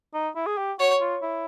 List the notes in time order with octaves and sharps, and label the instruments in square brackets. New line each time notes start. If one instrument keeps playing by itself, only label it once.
[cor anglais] D#4
E4
G#4
G4
[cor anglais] F#4 [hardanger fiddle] C#5
[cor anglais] F4
E4